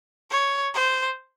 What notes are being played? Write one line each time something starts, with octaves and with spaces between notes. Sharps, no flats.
C#5
C5